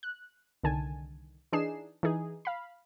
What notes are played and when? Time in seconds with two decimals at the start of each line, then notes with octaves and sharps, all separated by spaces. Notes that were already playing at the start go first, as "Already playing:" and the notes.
0.03 F#6
0.63 C2 D3 D#3 G#5 A5
1.52 E3 D4 D#4 G#4 C7 E7
2.03 E3 D#4 G#4
2.45 F5 B5